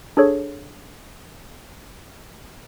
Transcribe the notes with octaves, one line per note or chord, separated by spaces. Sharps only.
D4 G#4 A4 C#5